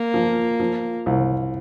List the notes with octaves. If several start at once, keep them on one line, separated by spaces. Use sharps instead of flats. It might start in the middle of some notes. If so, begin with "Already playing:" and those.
Already playing: A#3
F3
F3
C2